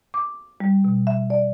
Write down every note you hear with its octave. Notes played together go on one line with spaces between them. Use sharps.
D6
G3
B2
E5
D5